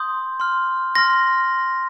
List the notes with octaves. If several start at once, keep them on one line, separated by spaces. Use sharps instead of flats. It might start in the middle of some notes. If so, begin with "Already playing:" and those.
Already playing: C6 D#6 G6
C6 F6
C6 F6 A#6